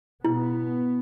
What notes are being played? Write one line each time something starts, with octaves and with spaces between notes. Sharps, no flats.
B2 B3 E4